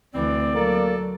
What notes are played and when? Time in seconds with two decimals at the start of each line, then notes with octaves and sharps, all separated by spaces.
0.14 D2 E3 C4 D5
0.55 F#3 A#3 A4